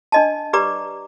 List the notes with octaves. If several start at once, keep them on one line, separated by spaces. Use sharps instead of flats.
D4 D#5 A5
G4 B4 D5 A#5 D6